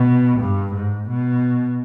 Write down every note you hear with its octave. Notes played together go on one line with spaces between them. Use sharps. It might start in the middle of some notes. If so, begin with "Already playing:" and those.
Already playing: B2
G2
G#2
B2